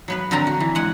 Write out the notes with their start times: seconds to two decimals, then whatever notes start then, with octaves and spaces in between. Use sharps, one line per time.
0.08 F#3 B3 B4
0.31 D3 F#3 C4 A#4 A#5
0.47 F#4
0.60 E3
0.75 G#3 F#5 G#5